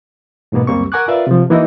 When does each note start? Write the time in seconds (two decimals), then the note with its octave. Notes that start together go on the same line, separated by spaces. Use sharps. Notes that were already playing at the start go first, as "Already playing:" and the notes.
0.52 E2 G#2 B2 A#3 B3
0.67 C#2 F#2 G3 A#3 C4 C#6
0.92 A#4 F#5 G#5 C#6 D6 F#6
1.08 F4 A#4 B4 D5 E5 F5
1.27 C3 F3
1.50 E3 A#3 D#4 E4 F#4 D#5